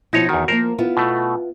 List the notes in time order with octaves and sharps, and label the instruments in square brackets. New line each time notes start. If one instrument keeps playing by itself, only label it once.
[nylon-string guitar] B2 F3 E4 [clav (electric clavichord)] D#4 C#5
[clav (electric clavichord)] E2 D#3 [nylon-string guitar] F#4
[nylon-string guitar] F3 G3 A#3 [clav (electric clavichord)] A#4 C5
[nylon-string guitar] B3 E4 F4
[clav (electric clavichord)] B2 A3